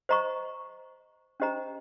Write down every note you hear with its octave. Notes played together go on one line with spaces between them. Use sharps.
C5 D#5 A#5 C#6
C#4 G4 C5 D#5 A#5